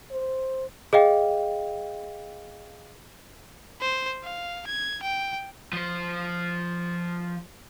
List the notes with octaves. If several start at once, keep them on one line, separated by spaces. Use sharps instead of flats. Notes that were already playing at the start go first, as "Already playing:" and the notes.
C5
G#4 D#5 F5 G5
C5
F5
G#6
G5
F3 C5